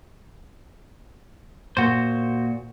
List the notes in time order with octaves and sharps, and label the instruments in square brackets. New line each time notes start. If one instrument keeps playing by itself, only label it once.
[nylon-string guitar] A#2 A#3 [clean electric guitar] F#4 C5